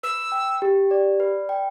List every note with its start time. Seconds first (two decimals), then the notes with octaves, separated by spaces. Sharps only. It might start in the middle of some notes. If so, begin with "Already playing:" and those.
0.03 B4 E6
0.32 G5
0.62 G4
0.91 D5
1.20 B4
1.49 G5